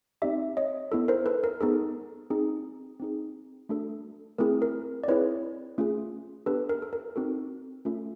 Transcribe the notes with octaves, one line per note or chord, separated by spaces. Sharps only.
C4 D#4 G4 D5 E5
C#5 D#5
B3 E4 A4
A#4 C5
A4 B4
A#4
B3 D#4 G#4 A4
C4 D#4 G#4
C4 D#4 G#4
A3 D4 F#4 A4
A3 C4 E4 G#4 A#4
A#4
D5
C4 E4 G#4 B4 C#5
A3 C#4 F4 G#4
B3 D4 G4 A4 B4
A#4
A4
A#4
C4 D#4 F#4 A4
A3 C#4 F4 A4